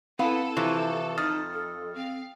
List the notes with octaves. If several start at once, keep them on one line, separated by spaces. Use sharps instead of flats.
B3 C4 E4 A4 F5 B5
C3 E3 F3 C#6
F2 D#4 D#6 F6 A6
A4
C4 F5